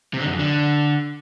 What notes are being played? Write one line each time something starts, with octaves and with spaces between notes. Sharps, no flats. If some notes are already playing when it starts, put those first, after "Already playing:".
C3
D3
F#2
F2
D3